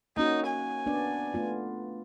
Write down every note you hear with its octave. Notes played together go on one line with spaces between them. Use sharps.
A#3 C#4 D#4 F#4
G#5
B3 D4 D5
A3 B3 F4